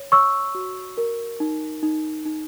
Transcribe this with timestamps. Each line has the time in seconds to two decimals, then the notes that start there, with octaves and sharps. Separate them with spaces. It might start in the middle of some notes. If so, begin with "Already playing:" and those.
Already playing: C#5
0.12 C#5 C#6 E6
0.55 F#4
0.97 A#4
1.40 D#4
1.83 D#4
2.25 D#4